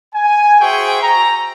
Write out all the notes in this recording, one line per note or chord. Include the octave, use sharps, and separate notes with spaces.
G#5
F#4 G#4 C5 E5 G5 C#6
A#5